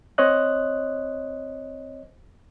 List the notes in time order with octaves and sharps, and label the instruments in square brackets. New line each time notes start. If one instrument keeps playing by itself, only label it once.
[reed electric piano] C4 C5 C#5 D#5 F#6